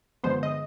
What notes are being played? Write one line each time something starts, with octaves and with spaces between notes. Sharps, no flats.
G2 D3 F3 G#3 B3 C5
D#5